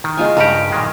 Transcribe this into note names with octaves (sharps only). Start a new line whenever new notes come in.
D#3
G#3 F4 G#5
G2 C#3 G4 A#4 F#5
A#2 D#3 G#3